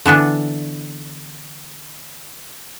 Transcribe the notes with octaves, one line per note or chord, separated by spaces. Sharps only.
D3 E3 B3 D4